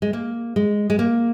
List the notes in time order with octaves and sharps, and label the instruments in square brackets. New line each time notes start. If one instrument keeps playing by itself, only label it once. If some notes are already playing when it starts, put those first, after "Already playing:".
[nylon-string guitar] G#3
A#3
G#3
G#3
A#3